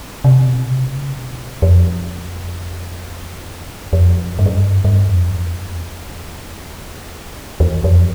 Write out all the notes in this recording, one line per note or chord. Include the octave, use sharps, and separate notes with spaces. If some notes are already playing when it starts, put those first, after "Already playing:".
C3
B2
C3
C#3
B2
F2
F2
G2
F#2
G2
G2
F2
E2
F2
E2
E2
F2